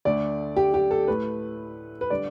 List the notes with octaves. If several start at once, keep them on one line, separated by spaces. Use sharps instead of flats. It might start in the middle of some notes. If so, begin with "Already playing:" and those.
D2 D3 A3 D5
G4
G4
A4
A2 A3 B4
B4
D3 G3 D5